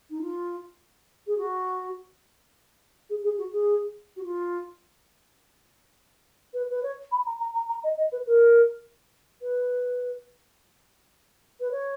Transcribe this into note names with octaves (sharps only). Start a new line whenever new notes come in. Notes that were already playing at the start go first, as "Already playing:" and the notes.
D#4
F4
G#4
F#4
G#4
G#4
F#4
G#4
F#4
F4
B4
B4
C#5
B5
A#5
A#5
A#5
A#5
D#5
D#5
B4
A#4
B4
B4
C#5